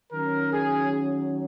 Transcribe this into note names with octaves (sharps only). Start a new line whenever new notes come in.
D#3 F#3 C#4 A#4
G#4